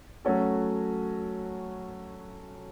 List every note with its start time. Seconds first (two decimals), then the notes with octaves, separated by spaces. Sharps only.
0.25 F#3 A3 C#4 F#4 A4